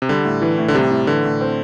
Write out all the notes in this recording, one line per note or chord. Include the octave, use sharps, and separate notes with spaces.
C3
D3 G3
A2
E3
A2
D3
C3 G3
A2
D3 E3
A2
C4